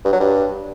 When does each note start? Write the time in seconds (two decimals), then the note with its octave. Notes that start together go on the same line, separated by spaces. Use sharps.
0.05 G2
0.12 F#3
0.20 G2